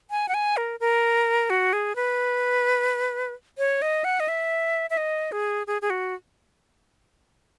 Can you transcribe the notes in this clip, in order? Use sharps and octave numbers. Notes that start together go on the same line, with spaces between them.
G#5
F#5
G#5
A#4
A#4
F#4
G#4
B4
C#5
D#5
F#5
D#5
E5
E5
D#5
G#4
G#4
G#4
F#4